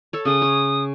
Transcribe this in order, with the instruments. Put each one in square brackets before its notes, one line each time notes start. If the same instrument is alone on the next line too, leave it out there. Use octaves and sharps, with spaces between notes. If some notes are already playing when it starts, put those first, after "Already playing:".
[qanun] A4 C#5
[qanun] C#3 G#4 [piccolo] D#6
[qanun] C#5